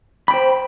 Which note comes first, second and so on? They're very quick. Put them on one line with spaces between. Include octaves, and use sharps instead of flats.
B5 G5 C5